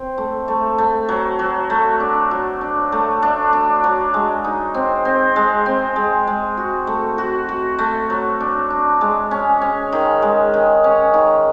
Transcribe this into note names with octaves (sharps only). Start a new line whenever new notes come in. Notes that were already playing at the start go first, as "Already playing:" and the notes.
Already playing: C4
A3
A3
A3
F#3
F#3
A3
D4
F#3
D4
A3
D4
D4
F#3
G#3
D#4
C4
C4
G#3
C4
G#3
G#3
F#4
A3
F#4
F#4
A3
F#3
D4
D4
G#3
C#4
C#4
D#3
G#3
D#3
C#4
D#3